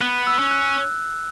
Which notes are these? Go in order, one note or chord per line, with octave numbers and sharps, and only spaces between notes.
B3 F#6
E6
C#4
F#6